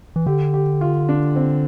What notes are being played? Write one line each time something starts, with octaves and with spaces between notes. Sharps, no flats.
E3
D3 G4
G4
F4
D4
C4